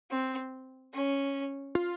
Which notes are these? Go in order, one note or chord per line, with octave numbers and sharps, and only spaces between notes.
C4
C#4
F4